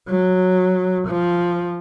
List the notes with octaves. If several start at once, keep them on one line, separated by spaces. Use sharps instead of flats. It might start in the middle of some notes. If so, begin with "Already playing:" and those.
F#3
F3